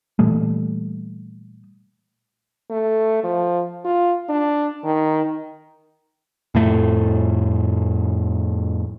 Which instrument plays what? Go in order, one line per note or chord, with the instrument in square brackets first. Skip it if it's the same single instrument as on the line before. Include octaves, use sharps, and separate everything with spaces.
[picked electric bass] A#2 E3 G3 A3
[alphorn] A3
F3
F4
D4
D#3
[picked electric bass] F2 A2 A3